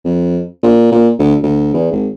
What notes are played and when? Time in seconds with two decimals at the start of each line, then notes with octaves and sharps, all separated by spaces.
0.04 F2
0.63 A#2
0.91 A#2
1.19 D2
1.43 D2
1.74 E2
1.92 G#1